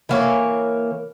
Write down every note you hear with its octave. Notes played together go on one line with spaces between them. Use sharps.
E3 A#3 C#5